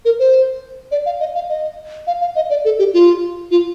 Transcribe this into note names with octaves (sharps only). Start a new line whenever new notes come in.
A#4
C5
D5
F5
D#5
F5
D#5
F5
F5
D#5
D5
A4
G4
F4
F4